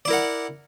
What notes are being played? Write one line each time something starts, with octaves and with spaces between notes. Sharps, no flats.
E4 A#4 D5 F#5